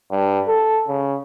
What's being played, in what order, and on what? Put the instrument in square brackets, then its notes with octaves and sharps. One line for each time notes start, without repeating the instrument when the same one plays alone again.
[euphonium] G2
A4
C#3